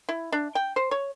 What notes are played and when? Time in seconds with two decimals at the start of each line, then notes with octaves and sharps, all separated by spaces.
0.09 E4
0.32 D4
0.55 G5
0.76 C5
0.91 C#5